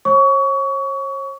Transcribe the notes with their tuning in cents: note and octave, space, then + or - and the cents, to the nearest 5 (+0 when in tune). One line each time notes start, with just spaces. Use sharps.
C#5 -40 C#6 +30